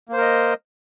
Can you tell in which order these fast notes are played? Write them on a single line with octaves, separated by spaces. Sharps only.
A#3 C5 A#4 D#5